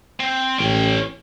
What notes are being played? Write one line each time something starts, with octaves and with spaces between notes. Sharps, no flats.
C4
A1 C#4 G5